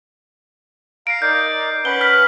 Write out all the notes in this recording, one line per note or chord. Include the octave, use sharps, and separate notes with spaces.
F5 A#5 C7 D7
D#4 A#4 D5 G6
C#4 B4 F#5 G7
F6 B6